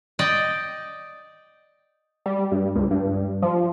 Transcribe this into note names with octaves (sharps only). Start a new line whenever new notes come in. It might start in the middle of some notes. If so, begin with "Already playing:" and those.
D5 D#5 G5
G3
G2
C#2
G2
F3